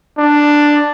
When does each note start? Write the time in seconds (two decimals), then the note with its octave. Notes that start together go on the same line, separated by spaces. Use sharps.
0.18 D4